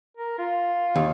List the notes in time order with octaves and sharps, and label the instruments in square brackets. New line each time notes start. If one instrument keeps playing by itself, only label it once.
[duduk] A#4
F4
[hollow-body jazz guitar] D#2